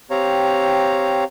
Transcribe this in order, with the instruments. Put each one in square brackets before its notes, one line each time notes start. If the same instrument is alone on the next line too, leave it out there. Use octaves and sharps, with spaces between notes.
[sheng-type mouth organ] C4 G4 C#5 F5 A#5